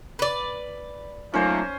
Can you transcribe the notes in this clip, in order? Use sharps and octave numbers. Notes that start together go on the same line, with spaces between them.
B4 D5
F#3 A3 A#3 C#4 D#4 F4 C5